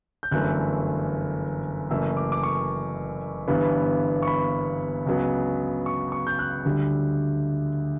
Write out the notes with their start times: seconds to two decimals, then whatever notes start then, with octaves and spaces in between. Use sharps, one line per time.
0.23 G6
0.31 G1 F#2 E3 A3 F#6
1.89 F#1 F#2 E3 A3 E6
2.17 D6
2.32 D6
2.43 C#6
3.48 G1 G2 E3 B3
4.22 C#6
4.27 B5
5.06 C#2 C#3 F#3 B3
5.86 C#6
6.12 C#6
6.27 G6
6.39 F#6
6.65 D2 D3 G3